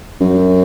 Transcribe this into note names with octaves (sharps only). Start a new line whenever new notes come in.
F#2